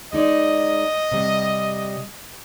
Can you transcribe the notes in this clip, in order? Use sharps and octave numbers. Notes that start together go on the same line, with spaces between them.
G#3 D#4 D5 D#5
C3 G3